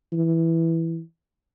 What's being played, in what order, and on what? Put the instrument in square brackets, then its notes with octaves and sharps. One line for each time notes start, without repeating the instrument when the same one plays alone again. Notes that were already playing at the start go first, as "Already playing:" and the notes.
[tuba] E3